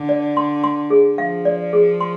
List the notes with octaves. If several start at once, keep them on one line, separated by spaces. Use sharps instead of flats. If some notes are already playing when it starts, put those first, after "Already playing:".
Already playing: D3
D5
C6
C6
G#4
F3 F5
D5
G#4
C6